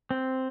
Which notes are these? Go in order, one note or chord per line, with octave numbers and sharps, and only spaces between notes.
C4